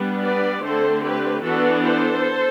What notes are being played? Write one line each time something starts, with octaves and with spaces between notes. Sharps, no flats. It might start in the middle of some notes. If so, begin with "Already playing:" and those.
Already playing: G3 B3 D4
B4 D5
D3 A3 C4 A4 C5
G4 B4
E3 B3 D4 F#4 A4
A4 C5